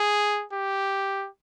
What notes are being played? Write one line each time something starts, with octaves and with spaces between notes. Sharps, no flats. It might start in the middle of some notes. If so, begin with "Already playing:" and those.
Already playing: G#4
G4